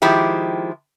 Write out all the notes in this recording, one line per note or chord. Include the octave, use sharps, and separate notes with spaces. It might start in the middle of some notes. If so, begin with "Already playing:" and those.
D#3 F3 G#3 E4 G4